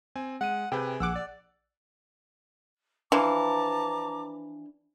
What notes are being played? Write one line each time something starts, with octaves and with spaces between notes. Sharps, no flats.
C4 G#5
G#3 F#5 D#7
C3 G#4 B4 G5
A#1 F#5 D6 E6 F#6
D5
E3 F3 D4 A5 A#5 D6